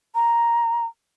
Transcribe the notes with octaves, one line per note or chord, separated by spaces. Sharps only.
A#5